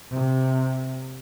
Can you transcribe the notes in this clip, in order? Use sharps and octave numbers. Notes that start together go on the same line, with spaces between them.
C3